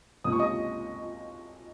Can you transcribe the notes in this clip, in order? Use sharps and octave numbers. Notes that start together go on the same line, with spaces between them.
C#2 C3 F3 A#3 D#6
C#6
D#5 D#6